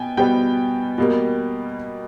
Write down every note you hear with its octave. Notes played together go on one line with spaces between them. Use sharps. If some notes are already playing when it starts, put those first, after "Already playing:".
Already playing: B2 B3 G5 G#5
B2 G3 B3 G5
B2 G3 A#3